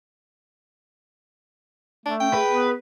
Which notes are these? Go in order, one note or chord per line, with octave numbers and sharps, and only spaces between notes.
A3 D4
C#4 G5
G#4 B4
B3